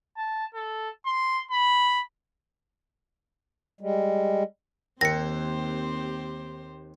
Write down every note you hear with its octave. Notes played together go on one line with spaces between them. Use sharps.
A5
A4
C6
B5
G3 G#3
D#2 C4 G4 C5 A#6 C#7